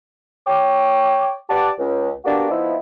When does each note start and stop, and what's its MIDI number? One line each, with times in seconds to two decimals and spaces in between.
0.47 1.34 73
0.47 1.34 79
0.47 1.34 86
1.50 1.70 67
1.50 1.70 71
1.50 1.70 74
1.50 1.70 78
1.50 1.70 81
1.50 1.70 86
1.79 2.11 37
2.25 2.46 58
2.25 2.46 59
2.25 2.46 62
2.25 2.46 66
2.25 2.46 67
2.25 2.46 74
2.51 2.76 53
2.51 2.76 59
2.51 2.76 63
2.51 2.76 64